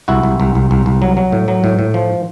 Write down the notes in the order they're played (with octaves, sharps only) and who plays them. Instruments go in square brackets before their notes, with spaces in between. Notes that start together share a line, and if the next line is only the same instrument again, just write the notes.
[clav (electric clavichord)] C2 E4 F#4
C2
C2
C2
C2
C2
F#3
F#3
A2
F#3
A2
A2
F3